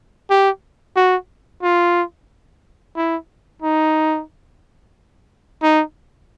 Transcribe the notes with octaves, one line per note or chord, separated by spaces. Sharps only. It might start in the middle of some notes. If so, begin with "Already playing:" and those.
G4
F#4
F4
E4
D#4
D#4